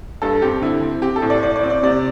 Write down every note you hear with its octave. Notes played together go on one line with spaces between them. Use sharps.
G2 A4
C4 G4
D3 E4
C4
C4 G4
A4
A2
D5
A2 D5
D5
C4
D5
C3 D5